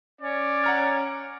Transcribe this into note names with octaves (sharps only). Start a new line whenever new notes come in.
C#4 D5
F#5 A#5 F6